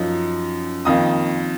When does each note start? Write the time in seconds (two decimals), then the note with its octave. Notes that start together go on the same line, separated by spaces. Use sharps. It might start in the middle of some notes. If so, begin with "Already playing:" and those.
Already playing: F#2 F3 D#4
0.85 F2 D#3 A#3 D#6